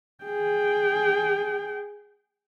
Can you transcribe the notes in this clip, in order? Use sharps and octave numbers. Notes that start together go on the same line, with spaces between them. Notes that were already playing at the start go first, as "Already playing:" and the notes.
G#4 G5